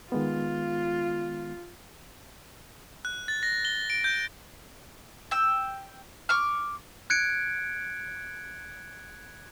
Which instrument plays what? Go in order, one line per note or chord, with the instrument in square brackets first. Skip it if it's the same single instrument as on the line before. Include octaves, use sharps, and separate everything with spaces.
[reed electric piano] D#3 G#3 B3 [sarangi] F4
[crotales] F#6
A6
A#6
G7
D7
G6
[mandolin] G5 E6
C#6 D6 F6
[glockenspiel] F#6 G#6 C#7 D7